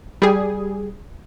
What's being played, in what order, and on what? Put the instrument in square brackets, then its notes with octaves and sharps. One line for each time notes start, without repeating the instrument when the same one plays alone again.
[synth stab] G3 G#4